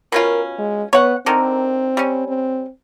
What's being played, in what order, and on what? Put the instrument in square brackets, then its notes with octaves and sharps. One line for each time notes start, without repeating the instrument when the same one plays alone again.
[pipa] B2 C#4 F4 [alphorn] A#4
[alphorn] G#3
[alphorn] B3 [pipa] C#5 F#5
[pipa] D3 D#3 A#4 [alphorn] C4
[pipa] G3 C#4
[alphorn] C4